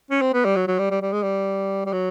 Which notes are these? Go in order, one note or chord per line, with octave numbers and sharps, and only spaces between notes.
C#4
C4
B3
G3
F#3
F#3
G3
G3
G3
G#3
G3
G3
F#3